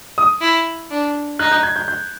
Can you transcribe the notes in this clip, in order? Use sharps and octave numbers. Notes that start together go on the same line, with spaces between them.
D#6
E4
D4
D#4 F#6
G6
G#6
G6
G6